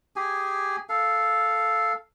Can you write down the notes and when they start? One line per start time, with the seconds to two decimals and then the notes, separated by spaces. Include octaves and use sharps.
0.16 G4 G#4 G#5
0.89 A4 F5